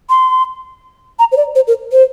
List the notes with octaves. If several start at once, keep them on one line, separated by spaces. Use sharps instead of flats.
C6
A#5
C5
D5
C5
A#4
C5